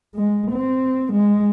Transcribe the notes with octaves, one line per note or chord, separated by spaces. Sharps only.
G#3
C4
G#3